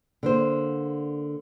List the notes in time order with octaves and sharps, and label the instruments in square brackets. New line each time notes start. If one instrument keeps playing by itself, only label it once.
[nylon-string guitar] D3 A#3 C5